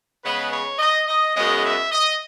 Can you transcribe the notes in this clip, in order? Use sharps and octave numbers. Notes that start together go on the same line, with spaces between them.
C#3 G#3 B3 B4
C#5
D#5
D#5
F#2 C#3 G#3 B3 D#5
E5
D#5